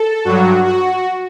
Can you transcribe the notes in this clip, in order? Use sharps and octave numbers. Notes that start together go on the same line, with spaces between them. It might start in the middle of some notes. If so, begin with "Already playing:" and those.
Already playing: A4
G2 F#3 F#4
F#4